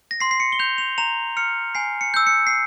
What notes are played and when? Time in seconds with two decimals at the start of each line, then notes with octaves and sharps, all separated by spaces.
0.11 A#6
0.20 C6 C7
0.31 C7
0.40 C#7
0.52 G7
0.59 G6 F7
0.78 F7
0.98 A#5 F7
1.37 F6 C#7
1.75 G#5 C7
2.01 C#7
2.14 E6 G6
2.27 C#7
2.47 C7